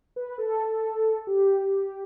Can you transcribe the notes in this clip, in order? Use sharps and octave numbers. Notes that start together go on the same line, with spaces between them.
B4
A4
G4